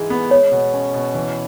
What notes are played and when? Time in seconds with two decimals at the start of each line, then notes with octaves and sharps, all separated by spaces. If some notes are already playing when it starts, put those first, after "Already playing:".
Already playing: G#2 E3 G#3
0.10 B3
0.30 G#3 C#5
0.52 B2
0.73 C#4
0.94 B2
1.14 E3